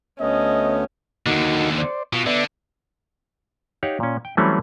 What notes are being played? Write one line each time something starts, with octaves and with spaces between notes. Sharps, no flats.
D2 A3 B3 C#4 D#5
D#2 D3 A#3 D#4 F#4
C5 D5
B2 F4
D3 B3 D5 E5
D#4 G4 C#5 F5 F#5
A#2 C#4
G5
E3 F#3 G3 A3 C4 C#4